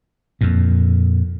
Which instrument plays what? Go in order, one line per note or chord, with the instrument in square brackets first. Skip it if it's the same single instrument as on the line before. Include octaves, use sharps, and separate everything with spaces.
[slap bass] F2 A#2